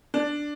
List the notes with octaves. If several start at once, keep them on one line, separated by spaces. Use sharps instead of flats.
D4